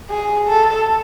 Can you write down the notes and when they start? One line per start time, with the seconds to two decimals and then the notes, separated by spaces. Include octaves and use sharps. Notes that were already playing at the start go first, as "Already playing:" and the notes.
0.10 G#4
0.49 A4